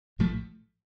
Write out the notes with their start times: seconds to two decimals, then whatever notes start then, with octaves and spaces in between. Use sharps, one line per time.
0.19 A#1 A2 F3 A3